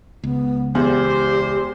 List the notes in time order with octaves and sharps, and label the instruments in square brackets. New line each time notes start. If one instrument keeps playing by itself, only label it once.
[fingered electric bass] C#2 [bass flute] B3
[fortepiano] E2 [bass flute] G4 [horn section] C5